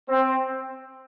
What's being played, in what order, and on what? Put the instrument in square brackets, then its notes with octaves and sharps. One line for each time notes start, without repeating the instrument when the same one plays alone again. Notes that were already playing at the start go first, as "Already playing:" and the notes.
[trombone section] C4